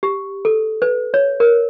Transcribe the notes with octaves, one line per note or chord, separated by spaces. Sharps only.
G4
A4
B4
C#5
A#4